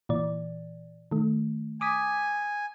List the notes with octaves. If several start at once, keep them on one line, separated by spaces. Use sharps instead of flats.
A#2 E3 D5
D#3 A3
G#5 D6 D#6 B6